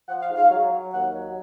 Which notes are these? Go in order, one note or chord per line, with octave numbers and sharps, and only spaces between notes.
F3 F#5
F5
G#2
F5
F#3
F#3
D#2 F#5
F#3